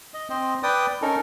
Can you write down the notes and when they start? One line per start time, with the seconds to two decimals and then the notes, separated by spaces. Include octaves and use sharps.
0.14 D#5
0.30 C4 C5 D#5
0.63 B4 D5 G5 D#6
1.02 C#4 D#4 A4 A#4